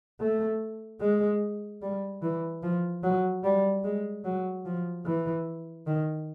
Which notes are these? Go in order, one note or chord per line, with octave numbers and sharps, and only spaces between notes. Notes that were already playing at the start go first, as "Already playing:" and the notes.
A3
G#3
G3
E3
F3
F#3
G3
G#3
F#3
F3
E3
D#3